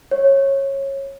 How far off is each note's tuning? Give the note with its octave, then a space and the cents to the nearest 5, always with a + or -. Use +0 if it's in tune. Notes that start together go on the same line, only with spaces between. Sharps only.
C#5 -20